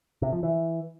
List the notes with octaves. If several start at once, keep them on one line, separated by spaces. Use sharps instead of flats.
C3
F3
E3